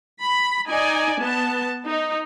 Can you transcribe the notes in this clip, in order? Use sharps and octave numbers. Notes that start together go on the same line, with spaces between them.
B5
D#4 D5 G#5
B3 A5
D#4